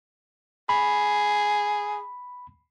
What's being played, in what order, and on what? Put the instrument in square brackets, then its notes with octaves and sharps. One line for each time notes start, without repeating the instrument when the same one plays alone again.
[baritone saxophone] G#4 [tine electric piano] B5